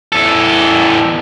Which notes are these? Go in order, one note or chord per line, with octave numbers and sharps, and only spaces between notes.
E2 A4